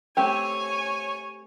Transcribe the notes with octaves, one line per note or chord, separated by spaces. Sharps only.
A3 C4 G4 C#5 G#5